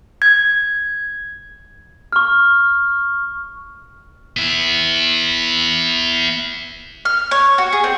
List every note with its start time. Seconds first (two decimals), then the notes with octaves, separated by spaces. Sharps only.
0.22 G#6
2.13 C#6 F6
4.37 B3 E4
7.05 F6
7.31 C#5
7.58 F#4
7.73 G#4
7.84 C4